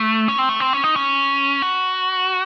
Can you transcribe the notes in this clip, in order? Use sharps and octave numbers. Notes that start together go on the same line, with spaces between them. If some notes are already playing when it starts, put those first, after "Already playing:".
Already playing: A3
C#4
C4
A3
C4
C#4
D#4
C#4
F#4